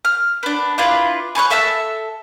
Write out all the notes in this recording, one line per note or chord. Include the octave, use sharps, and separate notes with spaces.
F6
B3 D4
D4 E4 F4 B4
G#4 B4 C#5 F#6
A4 E5 A5 E6